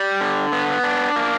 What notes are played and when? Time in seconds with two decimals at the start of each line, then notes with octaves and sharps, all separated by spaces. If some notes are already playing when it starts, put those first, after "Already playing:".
Already playing: G3
0.21 D3
0.52 B3
0.83 D4
1.16 A#3